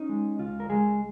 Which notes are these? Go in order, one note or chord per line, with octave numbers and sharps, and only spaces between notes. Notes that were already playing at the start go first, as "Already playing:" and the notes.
Already playing: C#4 D#4
G#3
C#2 F4
A#4
C#2 G#3 G#4